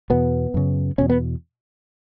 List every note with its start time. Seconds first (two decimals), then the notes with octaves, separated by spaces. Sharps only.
0.10 E2 B2 B3
0.54 F#2 C#3
0.98 E2 B2 C#4
1.10 B3